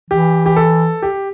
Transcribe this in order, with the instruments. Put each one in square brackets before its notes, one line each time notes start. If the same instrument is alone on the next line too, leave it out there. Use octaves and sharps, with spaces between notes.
[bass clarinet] E3 [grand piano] G4
[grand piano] G4
A4
G4